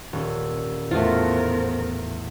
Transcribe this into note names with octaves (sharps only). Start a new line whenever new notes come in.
D#1 C#4 E6
E2 A2 A3 B3 F4 A#4 C5